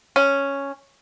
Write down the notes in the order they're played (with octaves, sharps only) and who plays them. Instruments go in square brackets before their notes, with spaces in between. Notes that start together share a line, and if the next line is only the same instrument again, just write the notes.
[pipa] C#4